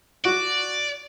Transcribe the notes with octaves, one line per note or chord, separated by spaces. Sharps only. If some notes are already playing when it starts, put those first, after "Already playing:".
F#4 D5